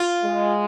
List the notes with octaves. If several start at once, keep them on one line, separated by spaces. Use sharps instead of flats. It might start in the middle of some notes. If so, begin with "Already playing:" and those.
Already playing: F4
G#3